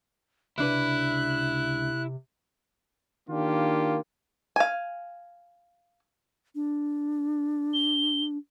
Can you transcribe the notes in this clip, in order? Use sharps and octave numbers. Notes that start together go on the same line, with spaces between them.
C#2 C3 D4 E4 B4 F#6
D#3 A#3 D4 F4 G4
F5 G#5
D4
G7